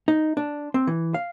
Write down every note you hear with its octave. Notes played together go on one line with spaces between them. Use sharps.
D#4
D4
C4
E3
F5